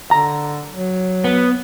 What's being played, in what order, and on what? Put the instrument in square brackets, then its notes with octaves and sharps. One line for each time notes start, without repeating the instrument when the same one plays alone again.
[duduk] D3 [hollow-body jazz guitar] A#5
[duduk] F#3
[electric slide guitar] B3